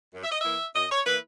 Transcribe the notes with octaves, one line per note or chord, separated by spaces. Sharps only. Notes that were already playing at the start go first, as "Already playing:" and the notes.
F#2
E5
D#5
E3 A#3 E4 E5
F#2 D#5
C#5
E3 A#3 E4 B4